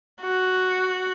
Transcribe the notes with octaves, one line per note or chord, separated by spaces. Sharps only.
F#4